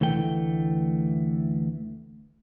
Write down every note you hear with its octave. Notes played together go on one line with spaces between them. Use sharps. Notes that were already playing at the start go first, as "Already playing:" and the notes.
D2 E3 A3 G5